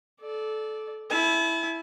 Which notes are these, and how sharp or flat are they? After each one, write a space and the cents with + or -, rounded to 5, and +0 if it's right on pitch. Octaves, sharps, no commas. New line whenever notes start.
A4 -20 D5 +0
E4 +0 A5 -40